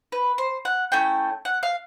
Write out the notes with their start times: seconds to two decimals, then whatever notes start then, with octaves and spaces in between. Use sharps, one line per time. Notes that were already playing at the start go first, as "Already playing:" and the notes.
0.12 B4
0.38 C5
0.65 F#5
0.92 A3 C#4 E4 G5
1.45 F#5
1.63 F5